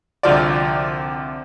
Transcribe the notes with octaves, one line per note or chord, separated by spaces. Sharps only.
C2 D3 F3 D5